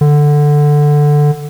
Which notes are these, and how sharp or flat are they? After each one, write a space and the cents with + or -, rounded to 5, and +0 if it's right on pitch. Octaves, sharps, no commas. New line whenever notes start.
D3 +5